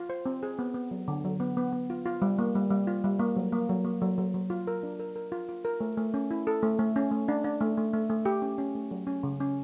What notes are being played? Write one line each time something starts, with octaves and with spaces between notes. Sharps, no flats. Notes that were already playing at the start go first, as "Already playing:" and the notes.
Already playing: F4
C5
C4
G#4
B3
B3
F#3
D3
F#3
B3
B3
B3
F4
F4
G3
A#3
G3
G3
F4
G3
A#3
F#3
A#3
F#3
A#3
F#3
F#3
F#3
F4
A#4
D4
A#4
A#4
F4
F4
A#4
A3
A3
C#4
E4
A4
A3
A3
C#4
A3
D4
D4
A3
A3
A3
A3
G4
C#4
C#4
A3
F#3
C#4
C#3
C#4